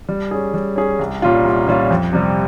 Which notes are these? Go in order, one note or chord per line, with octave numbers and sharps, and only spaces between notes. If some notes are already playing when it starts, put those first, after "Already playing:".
G3
C#4 G#4
G3
C#4 G#4
C2
A#2 G3 C#4 F4
C2
A#2 G3 C#4 F4
F2
C3 G3